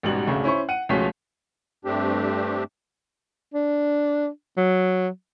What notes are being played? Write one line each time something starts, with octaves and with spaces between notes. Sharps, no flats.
A1 G#2 B2 G3 F#4 F#7
G#1 D2 C#3 A3
C#4 E4 C5 C#6
F#5 D#7
C#2 B2 F3 A3 C#4 B6
G2 A3 C4 D4 G4
D4
F#3